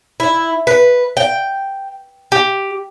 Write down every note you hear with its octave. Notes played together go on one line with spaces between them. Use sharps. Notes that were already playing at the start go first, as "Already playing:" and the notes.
E4
B4
G5
G4